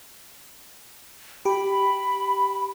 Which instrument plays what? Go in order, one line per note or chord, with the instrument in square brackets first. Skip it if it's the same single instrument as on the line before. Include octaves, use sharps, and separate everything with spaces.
[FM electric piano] G4 [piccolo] B5